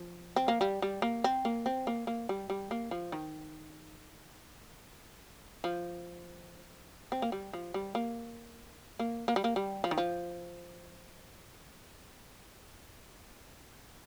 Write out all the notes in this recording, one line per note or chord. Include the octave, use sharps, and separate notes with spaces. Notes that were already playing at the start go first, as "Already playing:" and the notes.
Already playing: F3
C4
A#3
G3
G3
A#3
C4
A#3
C4
A#3
A#3
G3
G3
A#3
F3
D#3
F3
C4
A#3
G3
F3
G3
A#3
A#3
A#3
G3
A#3
G3
F3
D#3
F3